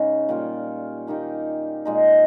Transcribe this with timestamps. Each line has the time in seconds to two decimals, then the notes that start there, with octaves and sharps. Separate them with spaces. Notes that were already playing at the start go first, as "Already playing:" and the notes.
Already playing: C#3 G#3 C#4 D#4
0.29 A#2 G3 A#3 F4
1.07 D#3 A#3 D#4 G4
1.85 A#2 G#3 D#4